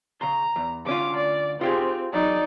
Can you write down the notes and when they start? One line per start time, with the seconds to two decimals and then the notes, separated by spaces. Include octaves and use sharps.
0.21 C#3 A#5 C6
0.56 E2
0.86 D2 C#4 F4 D6
1.17 D5
1.61 C4 F4 G4 G#4
2.13 E2 F#3 D#4 D5